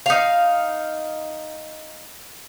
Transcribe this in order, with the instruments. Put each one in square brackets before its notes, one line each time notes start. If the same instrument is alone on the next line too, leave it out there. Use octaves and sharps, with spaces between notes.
[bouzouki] D#4 F5